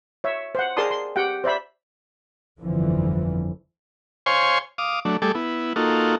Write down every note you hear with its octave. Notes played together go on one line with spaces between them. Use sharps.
C#5 E5
C5 F#5
G#4 A#4 D5 A5 C6 D#6
C6
G4 F#5 G5
C5 D5 E5 B5
G1 F2 D3 E3 F3
C5 C#5 F5 G#5 C6 C#6
F5 D6 D#6
F#3 A3 D4
G3 A3 G#4 A4 D6
B3 E4
A#3 D#4 F4 F#4 A4